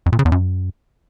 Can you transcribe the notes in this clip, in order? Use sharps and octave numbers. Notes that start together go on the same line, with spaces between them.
F2
A#2
C#3
E2
F#2